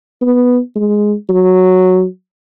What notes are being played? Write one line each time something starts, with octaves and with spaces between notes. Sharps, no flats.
B3
G#3
F#3